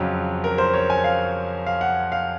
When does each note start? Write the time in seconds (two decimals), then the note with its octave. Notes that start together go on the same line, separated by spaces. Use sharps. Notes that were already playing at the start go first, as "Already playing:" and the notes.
Already playing: F2 C#3 F#3
0.44 A#4
0.58 C5
0.74 C#5
0.90 G#5
1.04 F5
1.67 F5
1.81 F#5
2.12 F5